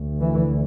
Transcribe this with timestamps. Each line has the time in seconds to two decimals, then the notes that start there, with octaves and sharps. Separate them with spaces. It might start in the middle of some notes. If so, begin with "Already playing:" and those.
Already playing: D2
0.20 E3